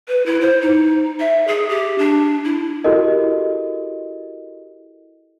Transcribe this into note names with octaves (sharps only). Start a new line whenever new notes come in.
B4
E4
C5
D#4
E5
G#4
G4
D4
E4
E4 F#4 G4 A4 A#4 D#5